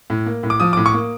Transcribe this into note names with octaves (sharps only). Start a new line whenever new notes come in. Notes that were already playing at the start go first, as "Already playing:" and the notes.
A2
A#3
A2
D6
F3 D#6
A2 D6
C#6
A#3